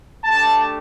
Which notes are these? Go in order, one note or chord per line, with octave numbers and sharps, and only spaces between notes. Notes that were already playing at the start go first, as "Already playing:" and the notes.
A3 D4 G4 A5